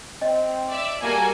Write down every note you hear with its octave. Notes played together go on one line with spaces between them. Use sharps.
C4 D#5
D5 E5
G3 A#3 F#4 A4 A#4 G#5